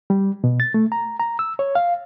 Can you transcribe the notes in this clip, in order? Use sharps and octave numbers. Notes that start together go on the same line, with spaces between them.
G3
B2
A6
A3
A#5
A#5
E6
C#5
F5